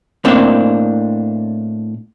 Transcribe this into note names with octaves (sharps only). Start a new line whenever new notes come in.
A2 A#3 C4 D4